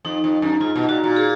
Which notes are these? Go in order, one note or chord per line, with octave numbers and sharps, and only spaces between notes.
F2 D#4
F2
F#2
G#2 F4
B2
A#2 F#4
A#2
G#4